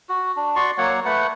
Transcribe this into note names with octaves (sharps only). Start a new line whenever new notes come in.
F#4
D4
F#4 D5 C6 C#6
F#3 A#3 C#5 F#5
A3 B4 F#5